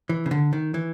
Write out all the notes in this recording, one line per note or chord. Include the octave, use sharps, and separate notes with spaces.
E3
C#3
D3
D#3
E3